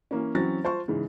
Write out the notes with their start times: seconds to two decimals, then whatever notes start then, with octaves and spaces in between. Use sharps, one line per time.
0.11 E3 A#3 C#4
0.35 E3 F#3 C4 C#4 A6 A#6
0.64 F4 C5 A5 C6 C#6
0.88 G#2 C#3 E3